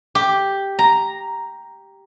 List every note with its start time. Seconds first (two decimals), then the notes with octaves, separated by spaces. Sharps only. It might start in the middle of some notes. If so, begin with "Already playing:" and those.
0.15 G4
0.79 A#5